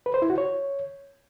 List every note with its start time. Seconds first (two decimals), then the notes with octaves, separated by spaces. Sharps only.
0.06 B4
0.14 C5
0.22 E4
0.30 F#4
0.38 C#5